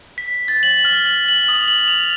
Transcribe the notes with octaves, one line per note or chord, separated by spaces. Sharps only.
B6
A6
F#7
F6
F#7
F#7
D#6
F#7
F7